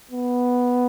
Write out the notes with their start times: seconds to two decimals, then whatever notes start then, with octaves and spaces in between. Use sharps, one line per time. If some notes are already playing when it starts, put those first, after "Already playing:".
0.11 B3